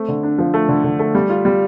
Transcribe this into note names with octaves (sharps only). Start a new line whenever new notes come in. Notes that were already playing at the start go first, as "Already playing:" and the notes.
Already playing: A3 C4
D3
D4
F3
A3
D3
D3
A3
G3
F4
G3